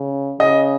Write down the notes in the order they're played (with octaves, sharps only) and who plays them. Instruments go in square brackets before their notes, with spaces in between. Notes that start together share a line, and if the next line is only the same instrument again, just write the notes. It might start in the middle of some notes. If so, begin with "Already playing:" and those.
Already playing: [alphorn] C#3
[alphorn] C#3 [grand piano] D#5